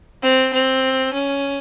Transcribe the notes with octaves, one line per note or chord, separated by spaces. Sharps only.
C4
C4
C#4